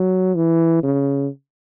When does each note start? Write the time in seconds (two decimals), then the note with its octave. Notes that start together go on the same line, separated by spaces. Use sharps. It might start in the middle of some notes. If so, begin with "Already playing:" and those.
Already playing: F#3
0.35 E3
0.83 C#3